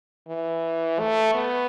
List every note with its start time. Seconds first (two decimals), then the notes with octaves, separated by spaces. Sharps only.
0.28 E3
0.99 A3
1.35 B3